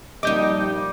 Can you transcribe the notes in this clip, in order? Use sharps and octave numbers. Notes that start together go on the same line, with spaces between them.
A#2 F3 G3 D#4 D#5 D6 G6